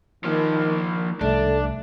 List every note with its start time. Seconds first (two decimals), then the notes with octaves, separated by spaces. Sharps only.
0.25 D#3 F3 A#3
1.21 C2 A3 D4